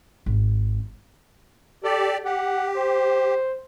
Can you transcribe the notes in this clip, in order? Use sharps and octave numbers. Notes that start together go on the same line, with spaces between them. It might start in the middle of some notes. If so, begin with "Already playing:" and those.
G#1
G4 A4 D5
G4 F#5
C5